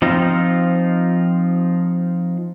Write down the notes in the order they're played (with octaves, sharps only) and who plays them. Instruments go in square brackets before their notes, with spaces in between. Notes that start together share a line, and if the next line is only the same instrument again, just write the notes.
[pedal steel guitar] F3 C4 D#4 F4